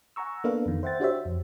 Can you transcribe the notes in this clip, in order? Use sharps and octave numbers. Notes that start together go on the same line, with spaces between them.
F#5 G#5 A#5 C#6 E6
A#3 B3 D4 A4 B4 F5
F2 D#3
C5 E5 F#5 G5 A6
D4 F#4 G4 C5 C#5 E5
F2